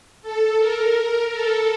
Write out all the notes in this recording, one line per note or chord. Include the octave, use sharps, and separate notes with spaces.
A4
A#4
A4